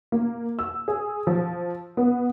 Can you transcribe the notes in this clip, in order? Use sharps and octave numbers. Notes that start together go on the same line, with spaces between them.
A#3
E6
G#4
F3
B3